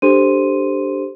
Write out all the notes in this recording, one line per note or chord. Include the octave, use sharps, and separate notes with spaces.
D4 G4 A4 C5 C6 D#7